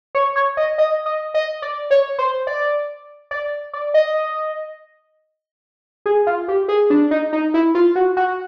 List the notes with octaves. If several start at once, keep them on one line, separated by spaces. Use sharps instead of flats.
C#5
C#5
D#5
D#5
D#5
D#5
D5
C#5
C5
D5
D5
D5
D#5
G#4
F4
G4
G#4
D4
D#4
D#4
E4
F4
F#4
F#4